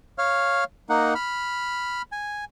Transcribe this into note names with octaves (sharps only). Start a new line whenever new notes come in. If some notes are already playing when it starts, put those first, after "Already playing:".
C#5 F5 F6
A#3 D#4 F#5
B5 F6
G#5